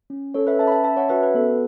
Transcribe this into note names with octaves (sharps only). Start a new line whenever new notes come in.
C#4
C#4 A4 C#5
B4 E5
C#4 E5 A5
B5
E5 A5
C#4 E5 A5
C#5 F#5
F#4 B4 E5
B4
B3 A4